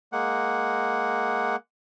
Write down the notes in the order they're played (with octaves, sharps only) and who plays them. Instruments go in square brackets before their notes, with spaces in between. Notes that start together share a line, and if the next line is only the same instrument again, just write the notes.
[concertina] G#3 A#3 F#5